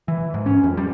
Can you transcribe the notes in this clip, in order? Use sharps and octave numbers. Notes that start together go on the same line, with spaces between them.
E3
G#2
C#4
F2
G3